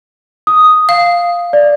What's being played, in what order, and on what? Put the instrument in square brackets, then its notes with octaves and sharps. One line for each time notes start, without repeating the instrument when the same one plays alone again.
[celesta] D#6
[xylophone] F5
[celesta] D5